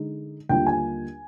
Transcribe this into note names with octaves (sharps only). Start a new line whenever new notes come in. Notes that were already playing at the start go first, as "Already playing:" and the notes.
Already playing: D3 G#3 D#4
D#2 D3 G3 D4 F4 G5
G#5